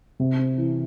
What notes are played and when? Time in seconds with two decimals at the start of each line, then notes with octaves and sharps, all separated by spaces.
0.20 C3
0.39 C4
0.58 E3